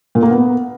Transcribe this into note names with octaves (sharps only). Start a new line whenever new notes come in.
A#2
A#3
B3